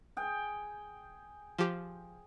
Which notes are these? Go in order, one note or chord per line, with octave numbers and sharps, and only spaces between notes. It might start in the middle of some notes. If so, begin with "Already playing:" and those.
G#4 G5
F3 G4